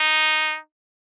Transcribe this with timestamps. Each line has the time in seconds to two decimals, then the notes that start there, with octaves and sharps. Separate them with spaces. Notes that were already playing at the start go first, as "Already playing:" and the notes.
Already playing: D#4